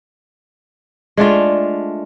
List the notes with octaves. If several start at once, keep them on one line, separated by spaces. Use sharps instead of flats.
G#3 A3 D4 F4